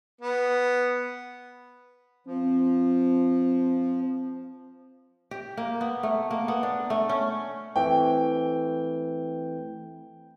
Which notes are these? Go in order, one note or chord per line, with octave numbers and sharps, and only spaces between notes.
B3
F3 C4
G4
A#3
B3
A3
A#3
B3
D4
A3
C#4
E3 A3 C4 G5